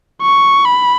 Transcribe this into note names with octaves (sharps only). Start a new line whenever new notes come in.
C#6
B5